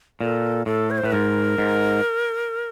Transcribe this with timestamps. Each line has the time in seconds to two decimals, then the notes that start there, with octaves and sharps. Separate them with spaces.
0.21 A#2 A4
0.66 A2 A4
0.91 C#5
0.98 C5
1.04 A2 B4
1.12 G#2 A#4
1.58 G#2